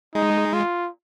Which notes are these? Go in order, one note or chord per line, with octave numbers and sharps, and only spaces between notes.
G#3 D#4
F4